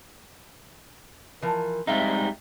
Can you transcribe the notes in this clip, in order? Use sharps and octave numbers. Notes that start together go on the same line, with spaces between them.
E3 F3 A#4
G3 G#3 C4 D#4 E5 F5 G5